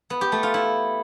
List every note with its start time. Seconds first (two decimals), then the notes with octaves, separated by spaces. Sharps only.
0.10 B3
0.21 G4
0.32 A3
0.43 F4
0.54 E4